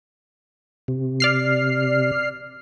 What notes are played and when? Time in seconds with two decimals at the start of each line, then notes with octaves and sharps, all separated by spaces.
0.88 C3
1.20 D5 F6 C7